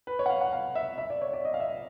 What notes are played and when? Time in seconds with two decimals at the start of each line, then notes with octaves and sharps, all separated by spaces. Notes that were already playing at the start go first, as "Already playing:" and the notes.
0.07 B4
0.19 C#5
0.26 F#5
0.30 F5
0.41 F#5
0.53 F5
0.75 E5
0.98 E5
1.10 D5
1.21 C#5
1.33 D5
1.45 D#5
1.54 F5
1.60 E5